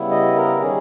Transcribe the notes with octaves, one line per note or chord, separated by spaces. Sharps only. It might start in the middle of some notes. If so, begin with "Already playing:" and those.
Already playing: C#3 G3 B3 E4
D#5
A#4
D#3 G3 C#4 G#4